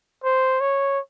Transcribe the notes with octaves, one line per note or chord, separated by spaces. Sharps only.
C5
C#5